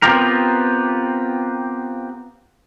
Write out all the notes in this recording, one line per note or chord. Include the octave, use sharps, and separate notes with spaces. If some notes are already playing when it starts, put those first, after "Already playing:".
B3 C4 F4 G4 A#4